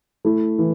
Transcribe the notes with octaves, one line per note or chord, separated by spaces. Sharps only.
A3 E4
E3